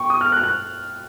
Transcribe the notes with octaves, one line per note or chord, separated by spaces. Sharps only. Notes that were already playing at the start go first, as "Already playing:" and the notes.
Already playing: G5 C#6
D#6
F6
F#6
F#6